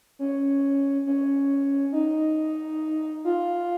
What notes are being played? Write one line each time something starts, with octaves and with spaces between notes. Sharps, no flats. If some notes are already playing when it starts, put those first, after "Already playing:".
C#4
C#4
D#4
F4